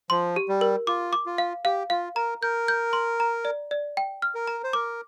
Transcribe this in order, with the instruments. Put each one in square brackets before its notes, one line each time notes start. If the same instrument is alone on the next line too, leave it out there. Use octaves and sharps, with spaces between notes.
[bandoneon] F3 [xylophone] C6
[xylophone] G4
[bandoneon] G3
[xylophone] A#4
[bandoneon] F4 [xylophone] D6
[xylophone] D6
[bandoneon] F4
[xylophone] F5
[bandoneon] G4 [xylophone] F5
[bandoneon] F4 [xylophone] F5
[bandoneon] A#4 [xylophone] A#5
[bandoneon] A#4 [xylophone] G6
[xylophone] G6
C6
A#5
D5
D5
G5
F6
[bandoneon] A#4
[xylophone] A#5
[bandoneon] C5
[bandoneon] A#4 [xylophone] D6